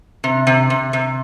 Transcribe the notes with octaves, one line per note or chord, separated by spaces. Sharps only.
C3
C3
C3
C3